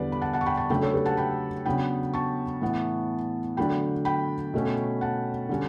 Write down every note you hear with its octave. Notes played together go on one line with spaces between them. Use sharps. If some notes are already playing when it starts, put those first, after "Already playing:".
Already playing: E2 D3 G3 B4 D5
B5
F#5 A5
F#5 A5
C#6
G5 B5
A5 C#6
C#3 F#3 A3 D4 G5 B5
A4 C#5
G4 B4
F#5 A5
G5 B5
C#3 F#3 B3 D4 G5 B5
A5 C#6
A2 E3 B3
D3 F#3 A3 D4 G5 B5
G5 B5
B2 A3 C#4
F#5 A5
D3 G3 C#4